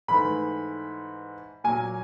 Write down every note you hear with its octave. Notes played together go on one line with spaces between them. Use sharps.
G#2 E3 A3 B5
A#2 F#3 A#3 G#5